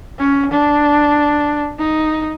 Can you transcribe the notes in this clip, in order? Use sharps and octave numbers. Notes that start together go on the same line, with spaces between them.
C#4
D4
D#4